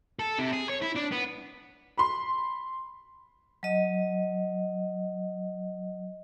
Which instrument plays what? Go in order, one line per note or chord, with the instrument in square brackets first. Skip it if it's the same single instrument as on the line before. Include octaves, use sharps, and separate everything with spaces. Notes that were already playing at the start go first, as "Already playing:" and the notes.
[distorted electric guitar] A4
C3
G#4
C#5
E4
D4
B3
[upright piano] B5 C6
[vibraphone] F#3 D#5